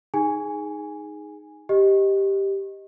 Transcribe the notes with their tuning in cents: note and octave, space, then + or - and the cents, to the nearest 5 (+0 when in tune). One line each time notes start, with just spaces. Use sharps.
D#4 +0 G#4 +0 G#5 -5
G4 +0 D#5 +5